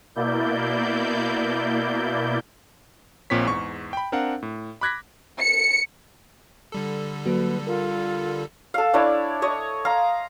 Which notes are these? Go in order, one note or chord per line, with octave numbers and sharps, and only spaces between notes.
B2 A#3 E4 D5 G6
A#1 A#2 C4 C#5 B6
E2 G#2 C#6
G5 B5
C4 D4 A#4 F5 F#5
A2
B5 D6 F#6 G#6 A#6 B6
C#7
D3 G3 A4
F#3 A#3 F#4 B4
F4 A#4
A4 F5
D4 E4 C#5 D5
C#5 D#5
F5 A#5 C6